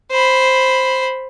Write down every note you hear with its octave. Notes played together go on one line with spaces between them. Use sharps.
C5 B5